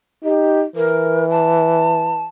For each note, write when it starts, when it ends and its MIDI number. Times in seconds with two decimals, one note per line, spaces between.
0.24 0.65 63
0.24 0.60 67
0.76 2.28 52
0.76 1.29 70
1.30 2.24 81